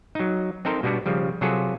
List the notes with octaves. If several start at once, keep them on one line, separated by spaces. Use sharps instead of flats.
F#3 D#4
C4 D#4 A4 A#4 C5
B2 G3 B3 D4 F#4
C#3 F3 G3
C3 F#3 F4 F#4 G#4 A4